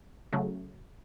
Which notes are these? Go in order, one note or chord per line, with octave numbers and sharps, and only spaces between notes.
C#3 F#3 A3